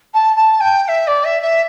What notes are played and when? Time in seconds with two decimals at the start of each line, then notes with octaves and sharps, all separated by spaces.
0.14 A5
0.36 A5
0.60 G5
0.83 G5
0.88 E5
1.07 D5
1.24 E5
1.42 E5